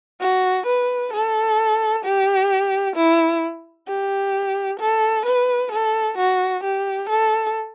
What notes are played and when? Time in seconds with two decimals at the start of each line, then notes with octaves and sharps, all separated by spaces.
0.21 F#4
0.67 B4
1.13 A4
2.05 G4
2.96 E4
3.88 G4
4.80 A4
5.25 B4
5.72 A4
6.18 F#4
6.64 G4
7.10 A4